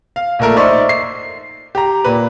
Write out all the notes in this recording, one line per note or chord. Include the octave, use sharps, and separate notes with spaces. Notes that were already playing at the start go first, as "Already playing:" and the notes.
F5
A#1 A#2 A3 A#4
D#4 C5 D5 E5 C6 C#6
C7
G4 A#5
A#2 B4